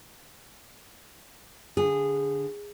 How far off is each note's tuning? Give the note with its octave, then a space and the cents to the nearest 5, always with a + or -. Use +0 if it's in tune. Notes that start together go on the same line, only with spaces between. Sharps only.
D3 -25 G#4 -20